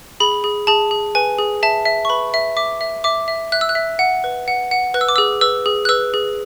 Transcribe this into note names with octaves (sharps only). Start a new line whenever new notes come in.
G#4 B5
G#4
G#4 A5
G#4
B4 G#5
G#4
E5 A5
E5
C#6
B4 B5
E5
E5 D6
E5
E5 D6
E5
E5 F#6
E6
F#6
E5
F#5
B4
F#5
F#5
B4 F#6
E6
D6
G#4 E6
B4 E6
G#4
F#6
B4 E6
G#4